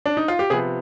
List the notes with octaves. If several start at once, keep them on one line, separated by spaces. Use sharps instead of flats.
D4
D#4
F4
G4
C3 F3 B3 G#4